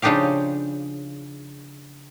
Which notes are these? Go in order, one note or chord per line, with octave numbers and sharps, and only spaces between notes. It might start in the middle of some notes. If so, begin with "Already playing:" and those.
C#3 F3 D4 D#4 G4 F5